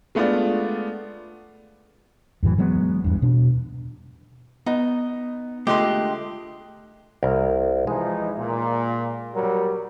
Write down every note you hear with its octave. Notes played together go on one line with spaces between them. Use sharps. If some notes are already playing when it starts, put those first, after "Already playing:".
G#3 A3 B3 D4 F4 D5
F2 A2 E3 F#3
E3 F#3 G#3 B3
E2 G2
B2 D4
B3 D#4
D3 G#3 A3 F4 G4 C6 F#6
C2 A#4
E3 F3 G#3 D#4
A#2
F#3 G3 A#4